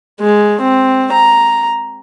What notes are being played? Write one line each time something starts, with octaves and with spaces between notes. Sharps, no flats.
G#3
C4
A#5